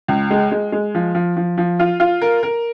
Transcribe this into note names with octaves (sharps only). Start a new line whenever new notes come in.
C#2
G#3
G#3
G#3
F3
F3
F3
F3
F4
F4
A#4
A#4